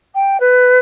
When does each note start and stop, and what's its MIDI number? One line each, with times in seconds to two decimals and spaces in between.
0.14 0.40 79
0.40 0.79 71